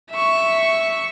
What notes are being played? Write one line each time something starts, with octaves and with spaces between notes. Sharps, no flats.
E5 C#6